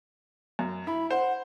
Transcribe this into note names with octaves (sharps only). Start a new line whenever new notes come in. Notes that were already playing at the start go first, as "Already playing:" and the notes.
F#2
E4 B5
C5 F#5